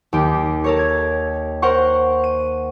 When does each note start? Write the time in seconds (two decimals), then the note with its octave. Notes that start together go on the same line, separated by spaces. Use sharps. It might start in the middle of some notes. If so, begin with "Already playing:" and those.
0.13 D#2 G4
0.64 A4 A#4 C#5
0.79 G#6
1.62 A#4 C5 F#5 C#6
2.24 D#7